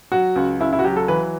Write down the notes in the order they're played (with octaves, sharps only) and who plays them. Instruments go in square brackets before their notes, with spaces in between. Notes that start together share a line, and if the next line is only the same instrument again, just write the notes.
[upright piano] F#3 F#4
C#2
C#2 E4
E4
F#4
F#3 G4
A4
E3 B4